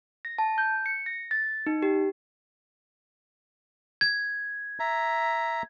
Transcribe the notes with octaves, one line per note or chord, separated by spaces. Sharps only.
A#6
A5
G6
C#7
A#6
A6
D#4
G4
G#6
E5 A#5